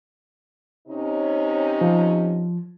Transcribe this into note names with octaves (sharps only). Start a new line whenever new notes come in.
C3 C#4 D#4
F3